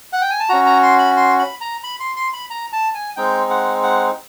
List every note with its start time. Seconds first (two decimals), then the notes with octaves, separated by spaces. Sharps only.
0.13 F#5
0.22 G5
0.31 G#5
0.40 A5
0.49 C#4 F#4 A#5
0.66 A#5
0.83 C6
0.99 B5
1.17 C6
1.39 B5
1.61 A#5
1.84 B5
2.00 C6
2.16 C6
2.33 B5
2.50 A#5
2.73 A5
2.94 G#5
3.16 G#3 C4 D#4 G5
3.50 F#5
3.83 F#5